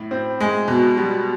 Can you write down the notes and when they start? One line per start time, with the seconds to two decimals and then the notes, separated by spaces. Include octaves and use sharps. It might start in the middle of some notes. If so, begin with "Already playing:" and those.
Already playing: A2
0.11 C4
0.40 G#3
0.68 B2
0.97 G3